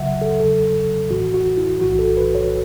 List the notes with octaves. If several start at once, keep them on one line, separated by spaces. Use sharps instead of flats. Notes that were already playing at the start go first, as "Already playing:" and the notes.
Already playing: C#2 C#3 F#3 E5 F#5
A4
E2 C#3 F#3 A4
A1 A2 E3 F#4
F#4
E4
B1 A2 E3 F#4
A4
B4
C#5